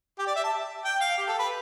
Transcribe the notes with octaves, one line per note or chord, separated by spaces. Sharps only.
G4
D5
E5
A5
G5
F5
G4
A4
B4